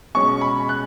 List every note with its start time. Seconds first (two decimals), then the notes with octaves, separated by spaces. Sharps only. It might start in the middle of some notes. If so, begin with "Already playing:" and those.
0.15 B2 G#3 C#4 C#6
0.41 B5
0.69 F#6